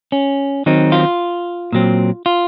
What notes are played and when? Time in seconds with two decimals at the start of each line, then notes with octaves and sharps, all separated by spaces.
0.12 C#4
0.66 D#3 F#3 C4 D#4
0.92 F4
1.73 A#2 F#3 C4
2.26 F4